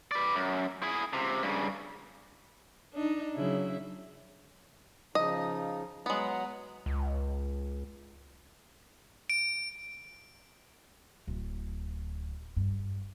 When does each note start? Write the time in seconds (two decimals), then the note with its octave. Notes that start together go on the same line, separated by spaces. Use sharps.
0.11 B4 D5
0.36 F#2
0.83 E4 G#4
1.13 C#2 C3
1.43 G2 C#3
2.93 D4 D#4
3.35 C#3 F#3 E4
5.15 C#3 F3 D#4 D#5
6.06 F#3 G#3 B3 F#5 A#5
6.86 C#2
9.30 D7
11.27 D1
12.56 G2